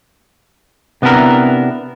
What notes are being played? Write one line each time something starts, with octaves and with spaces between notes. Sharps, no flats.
C3 B3 D4 E4 A#4